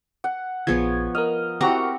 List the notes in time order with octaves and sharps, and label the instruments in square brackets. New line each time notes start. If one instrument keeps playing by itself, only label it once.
[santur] F#5
[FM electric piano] A#1 G#4 G#6 [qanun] F3 B3 C#5
[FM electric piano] A#4 F6 [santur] D#5
[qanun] C4 F#5 A#5 [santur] E4 F#4 G4